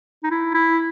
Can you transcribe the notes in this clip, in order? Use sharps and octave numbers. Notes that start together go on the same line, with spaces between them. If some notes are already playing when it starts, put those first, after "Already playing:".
D#4
E4
E4